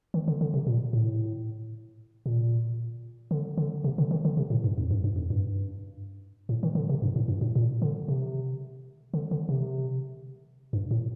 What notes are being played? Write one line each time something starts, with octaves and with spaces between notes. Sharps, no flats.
D#3
D3
D3
C3
A#2
A2
A#2
D3
D3
C3
D3
D#3
D3
C3
A2
G2
F2
G2
G2
F2
G2
A2
D#3
D3
C3
G2
A2
G2
A2
A#2
D3
C3
D3
D3
C3
G2
A2